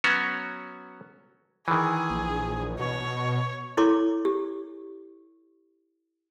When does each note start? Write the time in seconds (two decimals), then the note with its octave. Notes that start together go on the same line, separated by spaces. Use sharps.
0.04 F#3 B3 C#4 F#4 C#5
1.68 D#3 E3 G#4
2.10 A#1
2.79 B2 C#5
3.77 E4 A4 C#5 C6 D6
4.25 G4